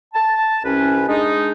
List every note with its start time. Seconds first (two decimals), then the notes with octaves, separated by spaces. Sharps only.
0.14 A5
0.64 C2 C#4 B4
1.08 G#3 D4 D#4